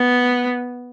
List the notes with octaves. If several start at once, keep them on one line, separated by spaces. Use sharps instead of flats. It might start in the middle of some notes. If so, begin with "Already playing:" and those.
Already playing: B3